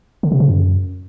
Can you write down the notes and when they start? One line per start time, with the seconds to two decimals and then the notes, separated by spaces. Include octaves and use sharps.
0.23 D3
0.32 C3
0.40 C#3
0.48 F#2